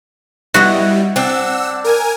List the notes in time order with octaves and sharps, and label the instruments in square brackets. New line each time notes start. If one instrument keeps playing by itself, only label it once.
[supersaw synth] G3 [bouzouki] B3 E4 D#5 [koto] F#4
[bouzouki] C4 D4 [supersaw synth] F#5 E6
[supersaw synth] A#4 G#5